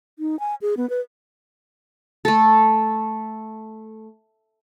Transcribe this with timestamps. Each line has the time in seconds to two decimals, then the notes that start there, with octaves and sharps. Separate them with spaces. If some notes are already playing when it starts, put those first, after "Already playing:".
0.19 D#4
0.40 G#5
0.62 G#4
0.77 B3
0.90 B4
2.25 A3 A4